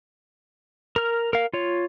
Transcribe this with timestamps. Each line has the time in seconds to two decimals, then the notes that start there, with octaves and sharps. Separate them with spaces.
0.96 A#4 F6
1.33 A#4 F5
1.53 F4 C#5